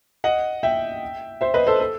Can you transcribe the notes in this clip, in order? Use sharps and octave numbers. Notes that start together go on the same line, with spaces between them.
D#5 F#5
E5 G5
C5 E5
B4 D#5
A4 C5
A4